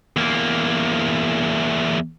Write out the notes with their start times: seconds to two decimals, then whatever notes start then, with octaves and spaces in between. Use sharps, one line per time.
0.16 E2 A#3